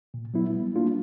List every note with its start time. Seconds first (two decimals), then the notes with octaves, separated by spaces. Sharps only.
0.14 A#2
0.34 F#3 B3 E4
0.55 G3
0.76 A#3 D4 F4